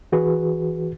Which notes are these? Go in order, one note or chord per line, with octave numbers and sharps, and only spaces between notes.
E3 F#4 G#4 B4